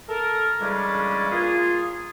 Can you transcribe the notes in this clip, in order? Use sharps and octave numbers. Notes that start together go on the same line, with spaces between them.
A4 A#4
C#3 E3 G3 G#3 C#4 D4
A#3 F4 G#4